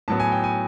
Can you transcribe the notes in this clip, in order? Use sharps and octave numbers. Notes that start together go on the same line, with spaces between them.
A2 F#3 B3 A5
G#5
G5
G#5